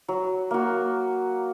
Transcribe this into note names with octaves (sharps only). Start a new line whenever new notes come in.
F#3
A#3 F#4